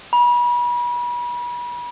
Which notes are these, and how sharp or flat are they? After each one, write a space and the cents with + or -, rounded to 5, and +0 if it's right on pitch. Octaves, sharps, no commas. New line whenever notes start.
B5 -35